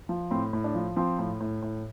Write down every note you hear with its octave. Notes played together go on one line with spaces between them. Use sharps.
F3
A2 C4
A2
D4
F3
F3 C4
A2
A2
A2